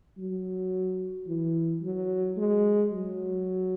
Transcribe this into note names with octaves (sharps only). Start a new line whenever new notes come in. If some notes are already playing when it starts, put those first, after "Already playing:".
F#3
E3
F#3
G#3
F#3